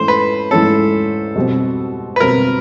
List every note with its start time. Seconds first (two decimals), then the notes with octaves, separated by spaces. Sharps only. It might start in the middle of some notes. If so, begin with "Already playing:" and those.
Already playing: G#2 E3 A3 C#4 C5
0.08 B4
0.51 G#2 E3 A3 C#4 A4
1.35 B2 G3 C4
2.16 B4
2.20 B2 G3 C4 A#4